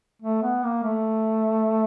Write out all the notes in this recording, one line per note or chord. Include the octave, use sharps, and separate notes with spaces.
A3
B3
A#3
A3